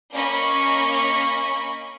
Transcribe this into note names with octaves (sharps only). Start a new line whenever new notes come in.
A#3 C#4 D#5 B5 C#6